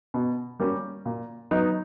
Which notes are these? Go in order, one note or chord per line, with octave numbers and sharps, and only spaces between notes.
B2
G3 A#3 C#4
A#2
F#3 B3 D#4